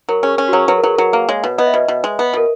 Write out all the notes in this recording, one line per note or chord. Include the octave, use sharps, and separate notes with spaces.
F#3 A#4
C#4 G#4
C#4
F#4
F#3 G#4
F#3 B4
A#4
F#3 G#4
F#3 A#4
A#3
G#3 C#5
B2
B3 D#5
E5
B2 B4 D#5
B2
G#3
B3
B2 A#4